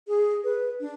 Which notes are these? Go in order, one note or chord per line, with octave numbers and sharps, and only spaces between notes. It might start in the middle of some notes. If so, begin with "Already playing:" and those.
G#4
B4
D4